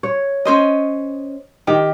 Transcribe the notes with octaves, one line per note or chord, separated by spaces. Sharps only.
C#5
C#4 C5 D#5
D#3 G4